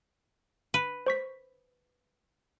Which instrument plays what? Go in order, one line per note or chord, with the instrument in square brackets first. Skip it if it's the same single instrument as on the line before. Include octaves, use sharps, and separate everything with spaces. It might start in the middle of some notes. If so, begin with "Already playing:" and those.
[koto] B4
[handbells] C5 C#6 B6